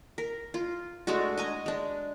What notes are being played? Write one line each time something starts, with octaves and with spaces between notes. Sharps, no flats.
A#4
F4
G#3 A3 D4 F#4
D#5 G#5 A#5
G#3 D4